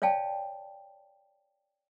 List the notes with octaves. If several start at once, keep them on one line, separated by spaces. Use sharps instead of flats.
C#5 D5 F5 G5 A5